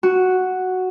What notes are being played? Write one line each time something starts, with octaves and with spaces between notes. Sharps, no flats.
F#4